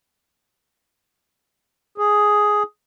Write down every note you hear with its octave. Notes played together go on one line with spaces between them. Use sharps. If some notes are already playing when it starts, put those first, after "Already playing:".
G#4